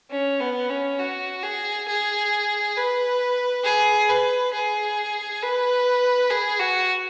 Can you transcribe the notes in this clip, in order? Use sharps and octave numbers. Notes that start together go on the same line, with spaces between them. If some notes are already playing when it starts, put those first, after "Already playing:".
C#4
B3
C#4
F#4
G#4
G#4
B4
G#4
B4
G#4
B4
G#4
F#4